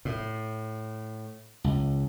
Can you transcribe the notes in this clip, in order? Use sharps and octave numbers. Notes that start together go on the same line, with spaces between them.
A2
C#2